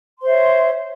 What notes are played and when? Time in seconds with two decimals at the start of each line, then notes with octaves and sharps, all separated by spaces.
0.18 C6
0.22 C5
0.27 E5
0.31 C#5